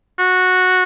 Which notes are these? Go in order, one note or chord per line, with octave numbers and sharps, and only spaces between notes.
F#4